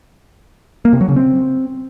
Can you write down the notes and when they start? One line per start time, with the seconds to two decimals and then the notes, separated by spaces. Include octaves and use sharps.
0.85 A#3
0.93 C3
1.01 F#3
1.09 C#3
1.16 C4